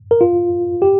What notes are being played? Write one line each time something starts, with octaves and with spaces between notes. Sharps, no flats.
A#4
F4
G4